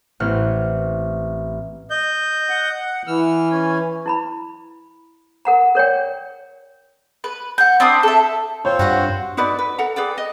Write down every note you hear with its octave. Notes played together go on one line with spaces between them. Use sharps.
A1 C4 F#5 F6 C#7
D#5 G6
F#5
E3 E6 F6
C#4 G#5
E4 A#5 B5
A#4 F#5 A#5
A#4 C#5 D5 G5
B4
F#5 G6
C4 D4 B5 D#6
A4 E5
C4 F4 C5 C#5
G2 F#4 B4 F#5
D#4 F#4 B4 D5
B4
A4 F#5 A#5
G#4 B4 D5 G5
D#5